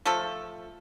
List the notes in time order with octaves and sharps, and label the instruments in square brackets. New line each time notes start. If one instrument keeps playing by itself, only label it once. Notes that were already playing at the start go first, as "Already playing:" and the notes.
[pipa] F3 A3 A4